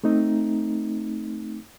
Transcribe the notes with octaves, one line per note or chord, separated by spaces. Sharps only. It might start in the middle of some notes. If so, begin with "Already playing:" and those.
A3 C4 D#4